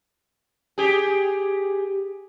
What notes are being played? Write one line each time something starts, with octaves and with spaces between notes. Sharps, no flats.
G4 G#4